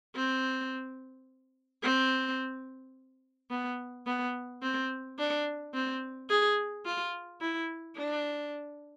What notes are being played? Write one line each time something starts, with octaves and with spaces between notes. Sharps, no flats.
C4
C4
B3
B3
C4
D4
C4
G#4
F4
E4
D4